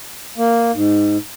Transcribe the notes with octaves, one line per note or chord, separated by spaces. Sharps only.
A#3
G#2